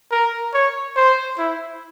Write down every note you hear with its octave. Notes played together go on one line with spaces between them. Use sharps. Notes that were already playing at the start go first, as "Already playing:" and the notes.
A#4
C#5
C5
E4